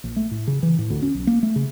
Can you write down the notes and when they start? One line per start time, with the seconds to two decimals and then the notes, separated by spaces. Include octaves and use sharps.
0.04 A#1
0.16 A3
0.31 A2
0.48 C#3
0.63 E3
0.78 A2
0.90 D2
1.02 C#4
1.15 B1
1.27 A#3
1.43 A3
1.56 C#3